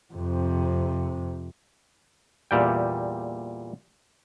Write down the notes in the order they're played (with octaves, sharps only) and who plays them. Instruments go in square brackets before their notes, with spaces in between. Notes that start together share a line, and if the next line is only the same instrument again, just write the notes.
[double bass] F2 C3
[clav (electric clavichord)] E2 A#2 G3 G5